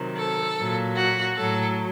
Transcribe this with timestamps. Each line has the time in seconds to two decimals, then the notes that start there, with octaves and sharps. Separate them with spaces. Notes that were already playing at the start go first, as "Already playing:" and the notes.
Already playing: C3 D#3 F#3
0.18 A4
0.56 F#3
0.62 A#2
0.97 F#4
1.37 A2 F#3 A4